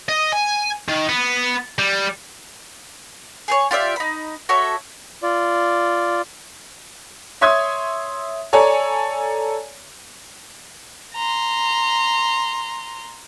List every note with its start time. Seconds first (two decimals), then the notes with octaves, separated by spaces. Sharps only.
0.09 D#5
0.33 G#5
0.89 D#3
1.09 B3
1.79 G3
3.48 G#4 B4 C#5
3.71 F4 G4 D5 E5
3.96 D#4 B5
4.49 F#4 A4 C#5 E5
5.23 F4 D5
7.41 C#5 E5 C6 D#6 G#6
8.53 A4 C#5 D5 G#5 A#5
11.14 A#5 C6